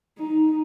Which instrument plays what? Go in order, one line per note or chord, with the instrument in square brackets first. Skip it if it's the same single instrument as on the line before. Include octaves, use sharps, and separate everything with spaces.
[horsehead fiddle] D#4